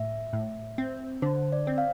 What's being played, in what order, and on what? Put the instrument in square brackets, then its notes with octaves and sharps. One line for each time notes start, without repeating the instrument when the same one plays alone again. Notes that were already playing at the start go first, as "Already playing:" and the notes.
Already playing: [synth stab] A2 [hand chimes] E5
[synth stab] A2
C4
[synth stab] D3 [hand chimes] C5
[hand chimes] D5
[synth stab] C4
[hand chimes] F5